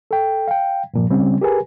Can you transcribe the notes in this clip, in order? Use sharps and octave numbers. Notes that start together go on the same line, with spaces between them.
A4 G5
F5 G5
G2 A#2 F3
C#3 G3 C4 C#4
G4 G#4 A#4 B4 G#5